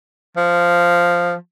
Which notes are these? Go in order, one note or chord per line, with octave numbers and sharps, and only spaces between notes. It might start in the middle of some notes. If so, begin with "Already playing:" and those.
F3